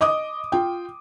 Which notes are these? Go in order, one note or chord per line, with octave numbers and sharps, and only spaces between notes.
D#5 D6 D#6
F4 G5